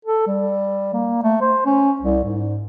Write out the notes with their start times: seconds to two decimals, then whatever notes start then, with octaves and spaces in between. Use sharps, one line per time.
0.05 A4
0.27 G3
0.93 A#3
1.23 A3
1.41 C5
1.66 C#4
2.01 C2
2.24 G#2